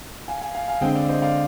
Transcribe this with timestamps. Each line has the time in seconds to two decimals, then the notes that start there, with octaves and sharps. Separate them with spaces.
0.28 F5 G#5
0.41 F5 G#5
0.55 F5 G#5
0.68 F5 G#5
0.81 D3 G#3 C4 D#5 G5
0.95 D5 F5
1.09 C5 D#5
1.22 D5 F5